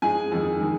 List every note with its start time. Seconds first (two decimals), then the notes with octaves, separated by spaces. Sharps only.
0.02 G#2 F3 G#3 G#4 G#5
0.32 F2 D#3 G#3
0.61 D#3 G#3